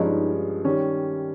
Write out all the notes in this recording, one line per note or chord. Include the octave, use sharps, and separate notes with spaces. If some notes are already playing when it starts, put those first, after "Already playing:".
Already playing: G2 F3 G#3 C#4 D#4
D#3 G3 C#4